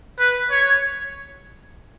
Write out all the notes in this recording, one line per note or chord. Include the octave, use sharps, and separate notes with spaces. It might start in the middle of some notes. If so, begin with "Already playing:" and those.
B4
C#5